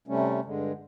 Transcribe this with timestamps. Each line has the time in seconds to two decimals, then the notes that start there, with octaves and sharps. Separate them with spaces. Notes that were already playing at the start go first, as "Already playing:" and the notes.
0.08 C3 G3 A3 C#4
0.45 G2 D3 G#3